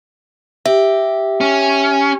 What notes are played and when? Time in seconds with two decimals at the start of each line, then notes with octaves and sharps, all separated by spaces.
0.66 G4 E5
1.41 C#4